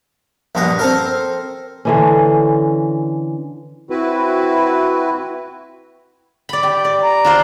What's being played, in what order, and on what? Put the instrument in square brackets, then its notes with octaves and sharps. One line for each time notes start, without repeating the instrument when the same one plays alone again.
[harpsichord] A#1 G2 B2 A#5 D#6
C4 A4 A#4
[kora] D3 E3 C#4
[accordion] C4 E4 F#4 B4
[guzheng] D5 B5
G4
D5
[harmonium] A#5
[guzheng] D4 F4 C5